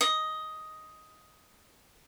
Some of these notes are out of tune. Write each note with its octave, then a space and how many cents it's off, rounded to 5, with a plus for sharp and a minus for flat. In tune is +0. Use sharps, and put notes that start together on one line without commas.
D#5 +10